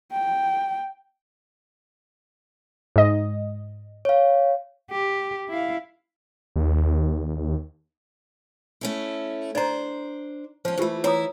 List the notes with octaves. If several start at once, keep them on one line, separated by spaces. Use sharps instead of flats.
G5
G#2 D#5
C#5 F5
G4
E4 F5
D#2
A3 C#4 E4
D4 C5 D5 D#5 A#5
F3 C#4 C5
E3 A3 F4 G4 C5
E3 E4 C#5 A#5 D#6